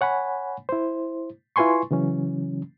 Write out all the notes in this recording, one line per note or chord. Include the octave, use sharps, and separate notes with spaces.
C#5 F#5 G#5 B5
E4 C5
E4 F4 B4 G#5 C6 C#6
C#3 E3 F#3 C#4